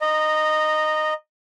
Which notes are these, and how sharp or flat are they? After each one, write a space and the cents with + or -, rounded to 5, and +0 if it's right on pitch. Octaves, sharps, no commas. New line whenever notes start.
D#5 -15 A#5 +0